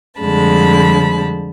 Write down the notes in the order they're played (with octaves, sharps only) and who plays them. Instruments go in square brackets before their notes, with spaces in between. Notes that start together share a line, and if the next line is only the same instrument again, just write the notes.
[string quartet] F2 D3 G3 G#3 A5 B5